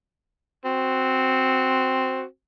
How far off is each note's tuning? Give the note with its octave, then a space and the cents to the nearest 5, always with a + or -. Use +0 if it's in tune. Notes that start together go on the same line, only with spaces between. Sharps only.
C4 +0 F#4 +0